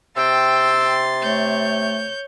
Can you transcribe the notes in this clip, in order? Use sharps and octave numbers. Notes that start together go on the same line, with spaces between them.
C3 G5 C6 E6 A6
A3 C#5 G6